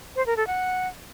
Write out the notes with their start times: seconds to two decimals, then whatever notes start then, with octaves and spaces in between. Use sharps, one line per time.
0.16 C5
0.26 A#4
0.37 A4
0.47 F#5